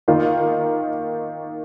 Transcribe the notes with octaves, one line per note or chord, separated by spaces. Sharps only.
D#3 A#3 D#4 F4